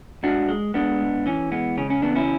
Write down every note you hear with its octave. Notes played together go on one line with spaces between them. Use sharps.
G#2 D4 F#4
G#3
G#3 B3 D4
G#2
E3 C#4
G#3 B3
C#3 C#4
C#4
E2 B3 D4
C#4 E4